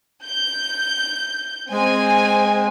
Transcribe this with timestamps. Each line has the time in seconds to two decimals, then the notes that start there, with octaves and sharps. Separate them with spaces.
0.24 G6
1.71 G#3 C4 G#5